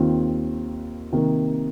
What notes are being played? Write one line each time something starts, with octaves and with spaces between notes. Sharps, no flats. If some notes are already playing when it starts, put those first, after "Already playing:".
Already playing: D#2 D#3 C4 F4
C3 D#3 A#3